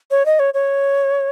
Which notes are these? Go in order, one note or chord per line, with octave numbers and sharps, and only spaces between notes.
C#5
D#5
C#5
C#5